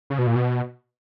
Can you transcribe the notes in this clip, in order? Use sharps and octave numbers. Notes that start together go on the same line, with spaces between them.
C#3
B2
A#2
B2